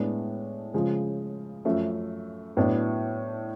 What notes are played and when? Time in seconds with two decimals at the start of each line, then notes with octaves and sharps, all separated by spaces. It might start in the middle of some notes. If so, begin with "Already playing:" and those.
Already playing: A2 G#3 B3 D4
0.74 C#3 F3 G#3
1.65 F#2 F3 A3
2.57 A2 F#3 B3 D4